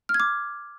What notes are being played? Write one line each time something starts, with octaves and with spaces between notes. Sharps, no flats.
F6
G#6
D6